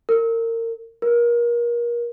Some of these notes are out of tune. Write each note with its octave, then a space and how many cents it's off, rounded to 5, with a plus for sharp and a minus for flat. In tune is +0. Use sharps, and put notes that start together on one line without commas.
A#4 -30
A#4 +30